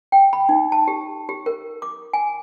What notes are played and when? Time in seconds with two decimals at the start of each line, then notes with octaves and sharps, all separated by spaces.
0.12 G5
0.33 B5
0.49 D#4
0.72 A5
0.88 G4
1.29 G4
1.46 A#4
1.82 D6
2.13 G#5